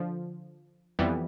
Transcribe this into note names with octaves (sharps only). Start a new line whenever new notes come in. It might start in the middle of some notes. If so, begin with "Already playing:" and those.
Already playing: D3 F3
F2 E3 G3 B3